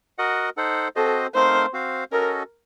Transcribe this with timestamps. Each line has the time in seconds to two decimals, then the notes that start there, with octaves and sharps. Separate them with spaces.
0.18 F#4 A#4 D#5 F#5
0.57 D#4 A4 C5 F#5
0.96 C4 F#4 A4 C5 D#5
1.35 A3 C4 D#4 A#4 C5 F5
1.73 C4 F#4 C5 F5
2.12 C#4 F#4 A4 A#4 D#5